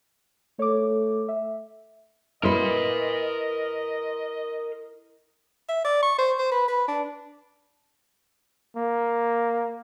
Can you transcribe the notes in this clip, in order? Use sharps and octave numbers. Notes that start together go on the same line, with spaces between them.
A3 C#5 D6
E5
E4 A#4 B4 D#5 C6
E5
D5
C#6
C5
C5
B4
B4
D4
A#3